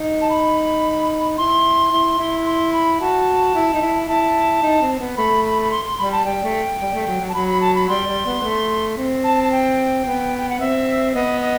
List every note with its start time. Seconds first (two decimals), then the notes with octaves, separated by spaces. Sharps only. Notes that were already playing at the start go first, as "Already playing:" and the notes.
Already playing: D#4
0.22 A5
0.30 B5
1.38 E4 C6
1.92 E4
2.19 E4
2.46 C6
2.73 B5
3.01 F#4 A5
3.54 E4
3.73 D#4
3.82 E4
4.08 E4 A5
4.63 D#4
4.81 C4
4.99 B3
5.17 A3 B5
5.45 B5
5.62 B5
5.71 C6
5.85 C6
5.98 G3 B5
6.12 A5
6.25 G3 G5
6.43 A3
6.80 G3
6.94 A3
7.07 F#3
7.21 F#3
7.29 A5
7.34 F#3 B5
7.48 B5
7.61 A5
7.75 B5
7.88 G3 C6
8.07 G3
8.25 B3
8.43 A3
8.97 C4
9.24 A5
9.44 A5
9.52 G5
10.05 B3
10.38 G5
10.49 F#5
10.59 C4 E5
11.14 B3 D#5
11.41 D#5